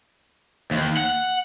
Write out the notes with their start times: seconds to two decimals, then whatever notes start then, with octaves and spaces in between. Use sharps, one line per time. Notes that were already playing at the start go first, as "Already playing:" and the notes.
0.71 D#2
0.97 F#5